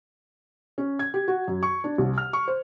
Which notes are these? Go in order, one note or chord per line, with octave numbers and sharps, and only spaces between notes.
C#4
G#6
G4
F#4
F#2
C#6
D4
C2
F6
C#6
C5